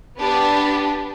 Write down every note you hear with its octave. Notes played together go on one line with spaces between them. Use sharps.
B3 D4 G4 B4